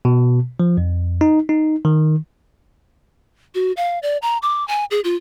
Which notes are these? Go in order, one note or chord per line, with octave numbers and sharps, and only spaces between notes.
B2
F3
F2
D#4
D#4
D#3
F#4
F5
D5
A#5
D6
G#5
G#4
F4